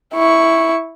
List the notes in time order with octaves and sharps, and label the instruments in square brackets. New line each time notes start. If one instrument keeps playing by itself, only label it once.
[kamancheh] E4 C#6